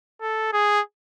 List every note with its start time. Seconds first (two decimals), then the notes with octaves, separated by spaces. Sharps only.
0.21 A4
0.53 G#4